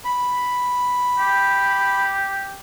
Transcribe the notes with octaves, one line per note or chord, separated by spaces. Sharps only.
B5
G4